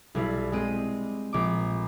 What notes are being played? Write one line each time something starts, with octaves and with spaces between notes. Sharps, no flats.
B1 G3 E4
G#3 C4 D#7
A#1 D6